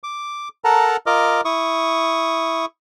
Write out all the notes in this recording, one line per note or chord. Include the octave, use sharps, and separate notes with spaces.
D6
A4 A#4 F#5 A5 A#5
F4 A#4 D#5 D6 F6
E4 C#6 D#6